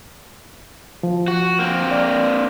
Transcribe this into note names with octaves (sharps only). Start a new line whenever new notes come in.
F3
F#4
A#3 C4
D5